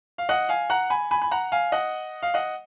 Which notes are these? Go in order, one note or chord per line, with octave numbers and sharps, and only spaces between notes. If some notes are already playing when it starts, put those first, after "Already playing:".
F5
D#5 F#5
F5 G#5
F#5 A#5
G#5 B5
G#5 B5
B5
F#5 A#5
F5 G#5
D#5 F#5
F5
D#5 F#5